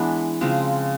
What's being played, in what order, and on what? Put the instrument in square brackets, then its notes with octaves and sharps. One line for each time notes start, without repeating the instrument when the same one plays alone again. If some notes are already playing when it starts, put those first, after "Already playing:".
Already playing: [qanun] E3 G#3 B3 D4
C#3 F3 G#3 C4